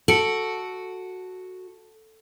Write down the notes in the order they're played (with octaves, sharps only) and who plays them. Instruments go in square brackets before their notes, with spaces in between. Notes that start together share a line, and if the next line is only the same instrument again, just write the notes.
[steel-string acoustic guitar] F#4 [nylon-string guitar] A4 [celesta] C#7 D7 F#7